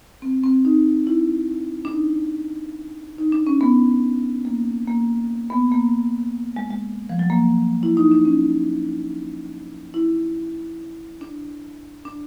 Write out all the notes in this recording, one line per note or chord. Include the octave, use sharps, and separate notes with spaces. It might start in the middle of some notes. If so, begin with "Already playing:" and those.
C4
C4
D#4
E4
D4
D#4
D#4
D4
C#4
B3
A#3
A#3
B3
A#3
G#3
G#3
F3
F#3
A#3
E4
D#4
D4
C#4
E4
D4
D4